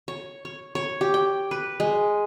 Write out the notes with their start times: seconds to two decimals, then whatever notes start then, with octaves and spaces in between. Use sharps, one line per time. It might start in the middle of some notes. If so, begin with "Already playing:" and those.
0.08 C#5
0.45 C#5
0.75 C#5
1.01 G4
1.14 G5
1.51 B4
1.80 G#3